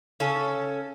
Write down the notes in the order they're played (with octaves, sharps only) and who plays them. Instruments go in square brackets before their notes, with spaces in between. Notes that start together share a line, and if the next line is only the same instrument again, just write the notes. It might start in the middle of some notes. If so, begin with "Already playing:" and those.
[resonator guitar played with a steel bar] C#3 C#4 A4